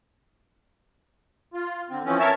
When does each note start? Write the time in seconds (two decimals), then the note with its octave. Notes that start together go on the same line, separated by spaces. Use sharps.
1.54 F4
1.90 D3 C4
2.05 E3 F3 C4 C#4
2.19 A#4 C#5 E5 A5